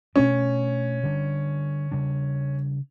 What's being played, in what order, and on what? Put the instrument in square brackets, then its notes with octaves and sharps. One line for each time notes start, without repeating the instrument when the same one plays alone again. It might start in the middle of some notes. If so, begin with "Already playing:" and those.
[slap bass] B2 A3 D4 [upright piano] C#4
[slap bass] D3 G3 D4
C#3 G3 D4